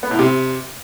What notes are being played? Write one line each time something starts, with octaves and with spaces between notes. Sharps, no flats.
B3
A2
C3